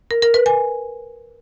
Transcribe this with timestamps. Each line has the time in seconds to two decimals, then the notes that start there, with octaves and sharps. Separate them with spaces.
0.11 A#4
0.22 A#4
0.34 B4
0.46 G#5